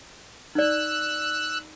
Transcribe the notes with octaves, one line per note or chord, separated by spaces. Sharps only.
D#4 D5 E6 F#6